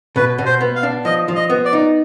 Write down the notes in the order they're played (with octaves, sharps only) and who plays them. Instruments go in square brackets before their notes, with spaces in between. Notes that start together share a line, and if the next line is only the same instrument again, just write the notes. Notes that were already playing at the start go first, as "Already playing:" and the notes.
[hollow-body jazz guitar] B2 [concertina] B4
[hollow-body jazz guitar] B2
[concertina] C5
[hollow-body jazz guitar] B3
[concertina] F5
[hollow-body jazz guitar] D4
[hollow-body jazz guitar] F3 [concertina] D#5
[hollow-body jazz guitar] F3
[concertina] D#5
[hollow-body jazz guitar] B3
[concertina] D5
[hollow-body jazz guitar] D#4